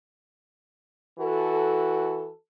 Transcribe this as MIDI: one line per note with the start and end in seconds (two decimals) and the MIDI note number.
1.18 2.28 52
1.18 2.28 66
1.18 2.28 69